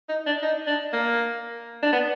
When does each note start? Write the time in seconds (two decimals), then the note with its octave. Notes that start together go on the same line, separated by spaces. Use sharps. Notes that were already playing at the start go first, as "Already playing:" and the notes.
0.09 D#4
0.26 D4
0.43 D#4
0.67 D4
0.93 A#3
1.83 D4
1.92 B3